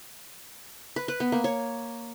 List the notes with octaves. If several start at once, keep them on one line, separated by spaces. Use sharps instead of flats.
B4
B4
B3
A#3
C#5